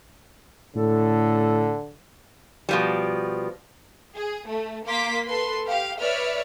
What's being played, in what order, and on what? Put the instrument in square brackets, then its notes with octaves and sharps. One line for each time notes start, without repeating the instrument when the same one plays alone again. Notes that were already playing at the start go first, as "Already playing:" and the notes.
[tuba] A2 [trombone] D3 [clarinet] A4
[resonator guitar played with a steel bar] B2 F3 G3
[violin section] G#4
A3
A#3 C6 D6 B6
A4 B4 C6
G4 F5
B4 C#5 D5 E5 F6